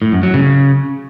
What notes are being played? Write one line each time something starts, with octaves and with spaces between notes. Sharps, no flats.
A2
F#2
F#3
C#3